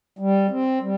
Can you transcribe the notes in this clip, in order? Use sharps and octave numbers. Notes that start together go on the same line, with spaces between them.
G3
C4
G3